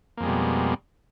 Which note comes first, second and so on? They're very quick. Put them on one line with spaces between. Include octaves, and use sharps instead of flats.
A#3 F2 G#3 G3 B2